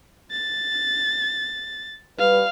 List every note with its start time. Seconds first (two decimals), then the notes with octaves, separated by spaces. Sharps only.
0.31 A6
2.19 G3 B4 F5